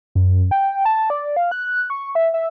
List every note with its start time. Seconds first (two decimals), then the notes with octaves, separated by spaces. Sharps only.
0.15 F#2
0.51 G5
0.85 A5
1.10 D5
1.36 F5
1.51 F#6
1.90 C#6
2.15 E5
2.34 E5